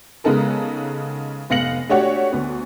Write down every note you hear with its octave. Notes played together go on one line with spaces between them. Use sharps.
C#3 G#3 B3 D#4 A4 A#4
F1 B3 F5 A#6 C#7 F#7
A3 D4 F#4 G4 C#5 F#5
D2 B3